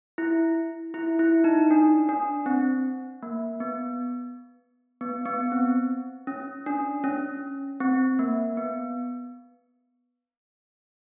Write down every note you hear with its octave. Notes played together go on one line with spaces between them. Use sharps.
E4
E4
E4
D#4
D4
D4
C4
A#3
B3
B3
B3
C4
C#4
D4
C#4
C4
A#3
B3